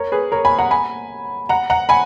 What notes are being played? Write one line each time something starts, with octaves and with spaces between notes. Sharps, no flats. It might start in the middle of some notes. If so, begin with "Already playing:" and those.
Already playing: A#4 C#5
G#4 B4
A#4 C#5
G#5 B5
F#5 A#5
G#5 B5
F#5 A#5
F#5 A#5
G#5 B5